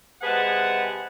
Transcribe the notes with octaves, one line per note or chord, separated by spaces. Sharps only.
C3 G#3 G#4 B4 F#5 A5